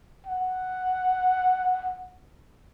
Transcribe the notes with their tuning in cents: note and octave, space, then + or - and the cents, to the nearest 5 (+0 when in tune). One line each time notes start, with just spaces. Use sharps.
F#5 +0